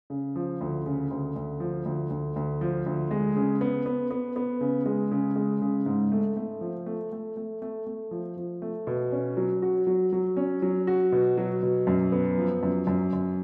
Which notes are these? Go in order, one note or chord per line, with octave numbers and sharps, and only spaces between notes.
C#3
F3
D2
C#3
D2
D2
F3
D2
D2
D2
F3
D2
G#3
C#3
B3
B3
B3
B3
C#3
G#3
C#3
G#3
C#3
G#2
A3
A3
F3
A3
A3
A3
A3
A3
F3
F3
A3
B2
C#4
F#3
F#4
F#3
F#3
C#4
F#3
F#4
B2
F#3
B2
F#2
B3
F3
F#2
F#2
F#2